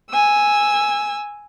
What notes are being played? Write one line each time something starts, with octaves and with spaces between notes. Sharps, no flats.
G#5 E6